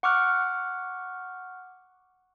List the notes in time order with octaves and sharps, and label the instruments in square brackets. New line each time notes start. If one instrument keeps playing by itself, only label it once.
[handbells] F#5 C#6 D6 F6 F#6